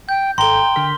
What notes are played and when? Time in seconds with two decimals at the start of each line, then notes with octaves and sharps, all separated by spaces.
0.09 G5 G6
0.38 G#1 A4 G5 A#5 C6 G7
0.76 D3 A#4 B6